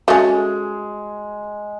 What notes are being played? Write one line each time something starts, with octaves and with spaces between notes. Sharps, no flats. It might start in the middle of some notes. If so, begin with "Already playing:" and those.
G#3 A3 C#4 F#4